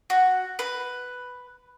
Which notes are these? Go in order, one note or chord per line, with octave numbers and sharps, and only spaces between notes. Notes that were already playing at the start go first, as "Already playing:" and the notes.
F#4
B4